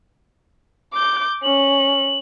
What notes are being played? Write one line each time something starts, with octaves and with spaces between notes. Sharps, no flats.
D6 G6
C#4 F#7